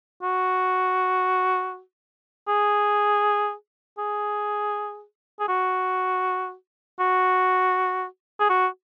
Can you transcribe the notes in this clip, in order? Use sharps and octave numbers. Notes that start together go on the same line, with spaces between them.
F#4
G#4
G#4
G#4
F#4
F#4
G#4
F#4